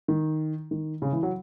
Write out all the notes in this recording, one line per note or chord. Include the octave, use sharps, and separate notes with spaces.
D#3
D#3
C#3
E3
F#3